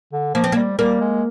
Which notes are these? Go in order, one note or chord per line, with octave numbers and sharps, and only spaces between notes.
D3
F3 A#3
C4
A#3
G3
G3 A#3
G#3